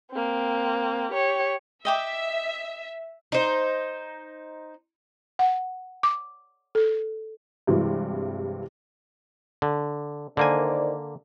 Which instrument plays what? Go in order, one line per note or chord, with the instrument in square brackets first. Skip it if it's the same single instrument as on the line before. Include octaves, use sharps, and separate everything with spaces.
[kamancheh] A#3 C4
G4 C#5
[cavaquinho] D#5 G5 D6 [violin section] E5
[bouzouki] D#4 C5
[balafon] F#5
D6
A4
[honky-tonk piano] G2 C3 E3 F#3 G#3
[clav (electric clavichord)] D3
[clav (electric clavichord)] D3 A#3 G#5 [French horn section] D#3 C5 D5